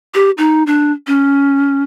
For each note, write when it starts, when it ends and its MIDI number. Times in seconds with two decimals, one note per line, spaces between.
0.14 0.31 67
0.38 0.63 63
0.67 0.92 62
1.07 1.83 61